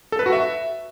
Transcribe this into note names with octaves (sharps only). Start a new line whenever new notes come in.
A4
B4
F#4
E5